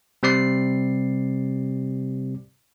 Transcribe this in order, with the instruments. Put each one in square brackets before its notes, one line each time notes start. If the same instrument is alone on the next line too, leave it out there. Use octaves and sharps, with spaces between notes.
[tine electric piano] C3 G3 C4 D5 C7